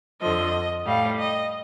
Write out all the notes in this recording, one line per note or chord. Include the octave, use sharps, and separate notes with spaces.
F2 D3 F3 D#5
A2 G3 F5
D#5